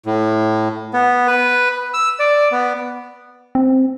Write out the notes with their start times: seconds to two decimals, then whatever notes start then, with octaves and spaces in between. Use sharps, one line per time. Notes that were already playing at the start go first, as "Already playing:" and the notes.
0.06 A2
0.93 B3
1.28 B4
1.94 E6
2.19 D5
2.52 B3
3.55 C4